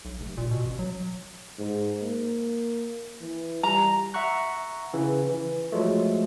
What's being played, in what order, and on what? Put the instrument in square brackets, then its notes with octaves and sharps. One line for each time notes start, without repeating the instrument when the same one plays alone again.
[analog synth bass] B1
F1
A#2
B2
A1
F#3
[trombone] G#2
A#3
E3
[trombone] G3 [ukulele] A#5
[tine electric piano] E5 F#5 A#5 C#6 F#6
C#3 E3
E3
F3 F#3 G#3 A3